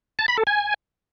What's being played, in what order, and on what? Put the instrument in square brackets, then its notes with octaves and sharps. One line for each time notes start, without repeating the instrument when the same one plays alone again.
[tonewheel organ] A5
B5
A4
G#5